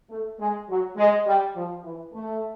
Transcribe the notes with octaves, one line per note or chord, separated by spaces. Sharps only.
A3
G#3
F#3
G#3
G3
F3
E3
A3